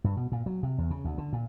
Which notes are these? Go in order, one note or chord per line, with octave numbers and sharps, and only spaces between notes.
G2
B2
A#2
F#3
C3
E2
C#3
D2
D3
A#2